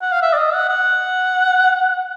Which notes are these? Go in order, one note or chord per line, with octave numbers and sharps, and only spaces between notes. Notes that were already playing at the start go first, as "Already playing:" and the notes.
F#5
F5
E5
D5
D#5
F#5
F#5